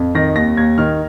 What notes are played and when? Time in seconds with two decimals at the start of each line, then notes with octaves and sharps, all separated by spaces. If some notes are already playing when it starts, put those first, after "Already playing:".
Already playing: F2
0.15 D#3 A#6
0.35 D#2 A#6
0.57 D#2 G#6
0.78 D#3 F6